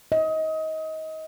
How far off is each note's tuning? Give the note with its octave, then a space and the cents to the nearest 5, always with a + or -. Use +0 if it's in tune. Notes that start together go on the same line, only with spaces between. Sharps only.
D#5 +25